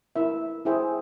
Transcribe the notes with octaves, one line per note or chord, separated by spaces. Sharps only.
E4 A#4 E5
E4 G#4 C5 E5 G5